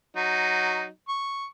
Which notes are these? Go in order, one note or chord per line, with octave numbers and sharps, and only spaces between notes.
F#3 D#4
C#6